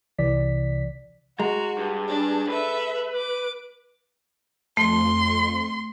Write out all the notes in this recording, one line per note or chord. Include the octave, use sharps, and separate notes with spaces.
C2 C3 E3 D5 B6
G#3 F#4 A#5
G2
D4 G#4
A4 B4 E5
D6
F2 A3 C6